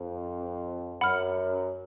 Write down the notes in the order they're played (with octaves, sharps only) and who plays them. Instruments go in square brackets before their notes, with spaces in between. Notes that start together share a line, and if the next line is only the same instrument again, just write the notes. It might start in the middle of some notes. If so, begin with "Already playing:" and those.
Already playing: [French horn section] F2
[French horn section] F#2 [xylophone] F#5 B5 F6